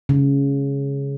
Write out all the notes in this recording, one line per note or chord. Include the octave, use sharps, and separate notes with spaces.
C#3